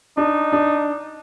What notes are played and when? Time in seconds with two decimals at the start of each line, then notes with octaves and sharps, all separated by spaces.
0.17 D4 D#4
0.52 D4